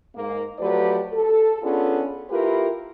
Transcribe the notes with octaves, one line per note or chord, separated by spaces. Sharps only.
G#2 A#3
F3 F#3 A3 G4 B4 D5
A4
B3 C#4 D4 F4 G#4 A4
A3 E4 F4 G4 A#4 B4